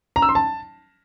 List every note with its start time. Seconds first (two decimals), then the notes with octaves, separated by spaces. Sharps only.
0.16 A#5
0.22 E6
0.29 C6
0.35 A5